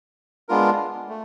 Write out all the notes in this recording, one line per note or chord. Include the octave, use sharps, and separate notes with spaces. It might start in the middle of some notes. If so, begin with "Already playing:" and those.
G#3 B3 D4 F4 A#4
A3